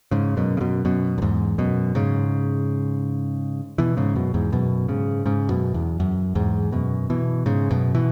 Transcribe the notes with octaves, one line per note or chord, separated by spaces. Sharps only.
G#2 C#3
F#2 B2
C#3
F#2 B2
F#2 B2
F#2
E2 G#2
F#2 B2
G#2 C#3
B2 E3
G#2 C#3
F#2 B2
E2 G#2
F#2 B2
G#2 C#3
G#2 C#3
F#2 B2
E2
F#2
E2 G#2
F#2 B2
B2 E3
G#2 C#3
F#2 B2
B2 E3